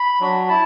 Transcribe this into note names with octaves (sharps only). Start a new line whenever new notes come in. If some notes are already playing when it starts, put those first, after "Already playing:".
Already playing: B5
F#3 D4 F#4
E4 A5